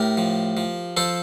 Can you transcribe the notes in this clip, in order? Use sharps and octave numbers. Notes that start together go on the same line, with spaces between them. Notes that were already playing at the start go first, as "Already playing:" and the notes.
Already playing: A2 G4 A#4
F3
F3
F3 A4 C5